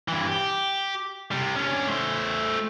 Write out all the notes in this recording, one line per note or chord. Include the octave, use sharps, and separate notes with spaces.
G2 E3
G4
C3 G3
C#4 D4
A3 C5